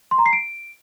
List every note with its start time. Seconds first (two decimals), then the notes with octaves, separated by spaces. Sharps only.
0.11 C6
0.18 A#5
0.26 C7
0.33 D7